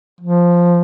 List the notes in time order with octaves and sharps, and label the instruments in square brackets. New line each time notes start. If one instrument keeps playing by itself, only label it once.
[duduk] F3